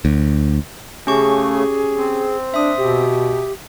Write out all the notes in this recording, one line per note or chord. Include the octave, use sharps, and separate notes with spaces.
D2
C#3 A3 C#4 G4 G#4 C#6
C4
D4 E5 D#6
B2 G4